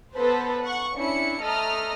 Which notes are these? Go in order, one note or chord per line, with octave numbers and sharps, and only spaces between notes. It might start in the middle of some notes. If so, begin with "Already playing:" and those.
B3 A4 B4 C5
F#5 C#6
C#4 D4 E4 C#7
A3 A4 D#5 A#5 D#6 F6